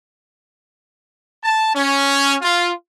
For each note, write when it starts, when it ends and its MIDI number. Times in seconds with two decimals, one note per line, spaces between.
1.44 1.72 81
1.74 2.36 61
2.41 2.71 65